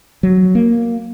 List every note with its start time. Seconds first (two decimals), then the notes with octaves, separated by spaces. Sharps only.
0.23 F#3
0.55 A#3